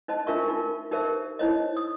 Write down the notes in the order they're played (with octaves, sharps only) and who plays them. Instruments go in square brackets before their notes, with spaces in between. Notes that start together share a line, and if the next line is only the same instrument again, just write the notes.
[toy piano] D#4 C5 D#5 A5
D4 F4 A#4 E5 C#6
D#4 F4 A#4
D#4 G4 A#4 C5 E5
D#4 E4 C5 C#5 D#5
D#6